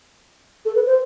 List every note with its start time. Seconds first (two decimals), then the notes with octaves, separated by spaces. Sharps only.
0.65 A4
0.75 B4
0.86 C5